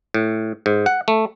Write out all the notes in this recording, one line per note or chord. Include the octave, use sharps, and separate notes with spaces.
A2
G#2
F#5
A3